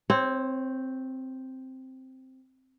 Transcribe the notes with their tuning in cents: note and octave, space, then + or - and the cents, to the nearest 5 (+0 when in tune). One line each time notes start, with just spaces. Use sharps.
C4 +0 C#5 -25